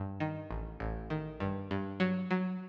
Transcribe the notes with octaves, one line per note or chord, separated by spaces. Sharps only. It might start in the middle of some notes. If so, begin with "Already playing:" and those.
Already playing: G2
D#3
A1
A1
D#3
G2
G2
F#3
F#3